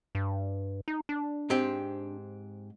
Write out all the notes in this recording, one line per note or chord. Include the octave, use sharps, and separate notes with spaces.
G2
D#4
D4
G#2 C4 G4